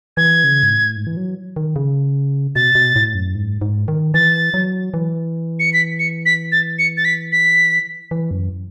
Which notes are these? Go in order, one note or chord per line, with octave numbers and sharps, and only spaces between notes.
E3 G#6
C#3
G#2
A2
G#2
E3
F#3
D#3
C#3
B2 A6
B2
A2
F#2
G#2
G#2
D#3
E3 A6
F#3
E3
C#7
B6
C#7
B6
A6
C#7
A6
B6
B6
E3
F#2